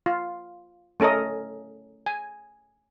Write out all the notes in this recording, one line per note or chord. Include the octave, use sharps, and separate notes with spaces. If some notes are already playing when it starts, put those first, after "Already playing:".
F4
A3 C#4 A4 A#4 D#5
G#5